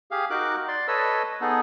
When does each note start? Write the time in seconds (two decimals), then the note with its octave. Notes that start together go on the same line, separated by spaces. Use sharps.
0.11 G4 G#4 F5
0.30 D#4 F#4 A#4 D6 F#6
0.68 D5 C6
0.88 A4 B4 C#5 D#5 E6
1.41 B3 D#4 G#4 A4